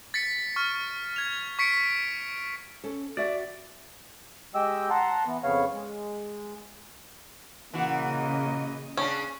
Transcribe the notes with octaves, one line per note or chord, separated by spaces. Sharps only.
A6 B6 C#7
C#6 F6
G#6 F7
C#6 B6 C#7 D7
C#4 A4
F#4 D5 E5 F#5
G#3 G4 D#5 G5 E6
F#5 A5 A#5 C6
E3 B3
F2 C#3 B3 C#5 F5
G#3
A#2 C#3 E3 A#3 F#4 D#5
C#3 C#4 D4